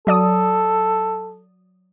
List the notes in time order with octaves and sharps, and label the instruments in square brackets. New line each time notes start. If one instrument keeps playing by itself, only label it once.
[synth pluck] F#3 D5 D#6 [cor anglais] A4